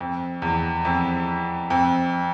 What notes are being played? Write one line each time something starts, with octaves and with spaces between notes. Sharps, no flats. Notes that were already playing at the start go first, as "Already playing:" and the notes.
F2
E2
F2
F2